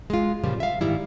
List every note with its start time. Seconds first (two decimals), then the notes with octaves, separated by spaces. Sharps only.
0.10 G#3 F4
0.43 A#2 C#3 F3 G3
0.60 E5 F5
0.81 G#2 D#3 G3 E4